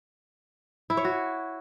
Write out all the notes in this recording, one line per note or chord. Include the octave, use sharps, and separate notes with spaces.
E4
C#5
F#4